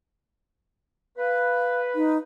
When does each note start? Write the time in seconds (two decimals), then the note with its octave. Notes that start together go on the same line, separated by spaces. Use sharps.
1.18 B4 F5
1.95 D#4